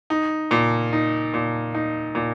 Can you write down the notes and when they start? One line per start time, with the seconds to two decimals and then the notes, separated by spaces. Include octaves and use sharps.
0.10 D#4
0.51 A#2
0.93 D#4
1.34 A#2
1.75 D#4
2.15 A#2